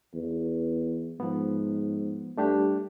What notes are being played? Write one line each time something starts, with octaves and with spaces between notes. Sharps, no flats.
E2
G#2 F3 B3
G2 A3 D4 G4